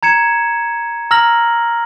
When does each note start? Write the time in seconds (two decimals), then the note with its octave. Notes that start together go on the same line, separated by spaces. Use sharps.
0.03 A#5 G#6 C#7 E7
1.11 A#5 E6 F6 A#6 F#7